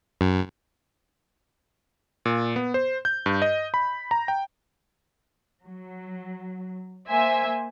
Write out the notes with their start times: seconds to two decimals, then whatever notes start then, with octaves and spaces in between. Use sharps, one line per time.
0.21 F#2
2.25 A#2
2.56 B3
2.74 C5
3.05 G6
3.26 G2
3.42 D#5
3.74 B5
4.11 A#5
4.28 G5
5.66 F#3
7.09 A#3 C5 E5 G#5